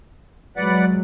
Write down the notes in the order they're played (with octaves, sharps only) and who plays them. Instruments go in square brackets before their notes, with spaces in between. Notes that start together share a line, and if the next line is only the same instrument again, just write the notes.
[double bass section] F#3 G#3 [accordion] B4 D5 F#5